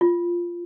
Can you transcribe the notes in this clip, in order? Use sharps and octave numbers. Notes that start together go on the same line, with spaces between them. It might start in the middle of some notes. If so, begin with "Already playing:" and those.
F4